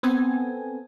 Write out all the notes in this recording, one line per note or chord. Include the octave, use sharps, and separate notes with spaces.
B3 C4 A4 G#5